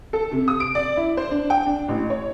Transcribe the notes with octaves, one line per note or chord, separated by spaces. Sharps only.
A4
C3
D#6
D7
D5
E4
C5
D4
G5
D4
A1
C#5